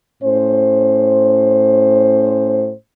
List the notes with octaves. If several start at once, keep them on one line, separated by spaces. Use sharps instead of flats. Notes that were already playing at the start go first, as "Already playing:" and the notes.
A2 C#4 C5